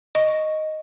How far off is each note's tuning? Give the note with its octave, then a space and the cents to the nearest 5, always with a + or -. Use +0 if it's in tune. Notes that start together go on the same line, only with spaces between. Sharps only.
D#5 +0 C#6 +0